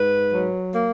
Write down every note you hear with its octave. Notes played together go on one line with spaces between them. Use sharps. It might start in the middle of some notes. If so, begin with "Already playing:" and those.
Already playing: G#2 B4
F#3
A#3